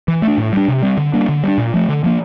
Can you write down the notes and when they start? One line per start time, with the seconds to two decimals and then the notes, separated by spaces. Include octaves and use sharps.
0.08 E3
0.22 A3
0.27 D4
0.38 A2
0.53 G3 D4
0.68 C3
0.82 G3 C4
0.97 D3
1.13 G3 A#3 D4
1.29 D3
1.43 G3 D4
1.58 A#2
1.74 F3 A3
1.89 D3
2.04 F3 A#3